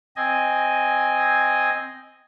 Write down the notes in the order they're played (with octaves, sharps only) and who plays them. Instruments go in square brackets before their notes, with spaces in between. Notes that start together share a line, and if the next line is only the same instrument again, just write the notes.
[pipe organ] C4 D#5 G#5